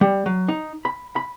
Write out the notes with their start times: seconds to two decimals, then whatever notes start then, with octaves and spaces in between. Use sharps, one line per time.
0.01 G3
0.26 F#3
0.48 D#4
0.85 B5
1.16 B5